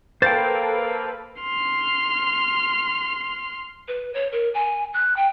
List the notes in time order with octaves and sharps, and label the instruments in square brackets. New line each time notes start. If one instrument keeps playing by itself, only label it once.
[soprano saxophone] A#3 [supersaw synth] A4 B4 [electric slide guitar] C5 F5 G5 [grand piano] A6
[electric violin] C6 F6
[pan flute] B4
C#5
A#4
G#5
F#6
G5